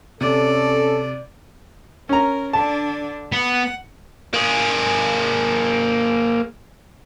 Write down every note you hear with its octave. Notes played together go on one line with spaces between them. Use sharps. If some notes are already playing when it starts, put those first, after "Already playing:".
C3 C#4 A4 D5
C#4 A#4 A#5
D3 D4 A5
B3 F#5
A#3 G#4